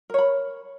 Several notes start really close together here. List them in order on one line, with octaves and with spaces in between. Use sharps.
A#4 C#5 B5